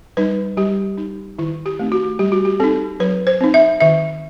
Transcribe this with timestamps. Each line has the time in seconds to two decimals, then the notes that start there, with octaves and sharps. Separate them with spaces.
0.17 G3 D#4 B4
0.57 G3 G4
0.98 D#4
1.39 D#3 E4
1.66 G4
1.79 A3 C4 D#4
1.92 F#4
2.19 G3 G4
2.32 F#4
2.45 G4
2.60 C4 D#4 A4
3.00 F#3 B4
3.27 C5
3.41 C4 D#4
3.54 E5
3.81 D#3 E5